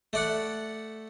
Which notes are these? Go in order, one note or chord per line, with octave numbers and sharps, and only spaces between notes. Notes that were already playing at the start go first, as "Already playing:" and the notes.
A3 D5 F#5